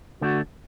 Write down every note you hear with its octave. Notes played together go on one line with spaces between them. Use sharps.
D3 A3 D4 F#4